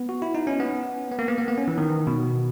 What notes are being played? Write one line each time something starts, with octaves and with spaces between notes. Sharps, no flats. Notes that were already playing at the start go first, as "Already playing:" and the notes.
Already playing: B3
F#4
E4
D#4
C#4
B3
B3
A#3
B3
A#3
B3
C#4
E3
D#3
B2